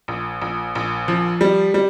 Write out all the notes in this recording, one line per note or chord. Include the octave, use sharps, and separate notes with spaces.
A#1
A#1
A#1
F3
G3
G3